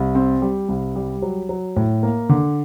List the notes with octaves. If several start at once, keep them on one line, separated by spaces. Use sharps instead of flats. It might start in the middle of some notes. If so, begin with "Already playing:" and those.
Already playing: C2
C4
G3
C2
G3
F#3
F#3
A2
A#3
D3